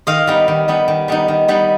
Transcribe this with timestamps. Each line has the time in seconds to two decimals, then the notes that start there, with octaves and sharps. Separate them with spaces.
0.07 D#3 D#5 F5
0.27 G3 B3 D#4
0.48 D#3
0.68 G3 B3 D#4
0.88 D#3
1.08 G3 B3 D#4
1.28 D#3
1.48 G3 B3 D#4